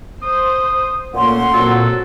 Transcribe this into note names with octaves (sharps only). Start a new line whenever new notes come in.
C5 D#6
A#2 A3 A#3 C#4 F#5 C6
A#2 F#3 C4 A4